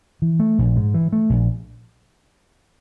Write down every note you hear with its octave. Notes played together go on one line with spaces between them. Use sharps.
E3
A3
A#1
G#2
E3
A3
A#1